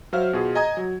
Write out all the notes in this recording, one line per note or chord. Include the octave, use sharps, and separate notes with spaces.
F#3 C5 E5 F5 F6
B2 F4 G#4
D#5 G#5 A#5 D#6 G#6
F#3